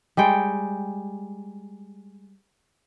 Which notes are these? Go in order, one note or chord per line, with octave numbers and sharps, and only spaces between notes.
G3 G#3 G5